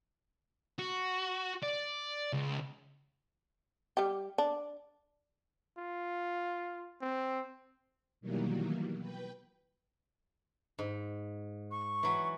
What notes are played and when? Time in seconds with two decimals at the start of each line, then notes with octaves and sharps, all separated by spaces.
0.79 F#4
1.62 D5
2.33 C#2
3.97 G3 G4
4.38 D4
5.78 F4
7.01 C4
8.21 B2 D#3 E3 F#3 G3 A#3
8.99 B4 G5
10.79 G#2
11.71 C#6
12.03 E3 F#3